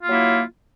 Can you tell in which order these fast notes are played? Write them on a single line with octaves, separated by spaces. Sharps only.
F4 A#3 F#3 E4